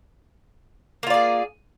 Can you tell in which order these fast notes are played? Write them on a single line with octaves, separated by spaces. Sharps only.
A#3 F4 D5 G#4